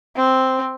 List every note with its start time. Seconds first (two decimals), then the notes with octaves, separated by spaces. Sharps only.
0.16 C4